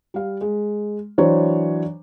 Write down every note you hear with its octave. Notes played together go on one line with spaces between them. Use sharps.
G3 F5
G#3
E3 F#3 D4 C5 C#5